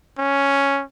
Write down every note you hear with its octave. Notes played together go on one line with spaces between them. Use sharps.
C#4